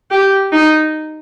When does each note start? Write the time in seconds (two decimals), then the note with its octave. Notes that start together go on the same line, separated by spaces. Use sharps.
0.11 G4
0.52 D#4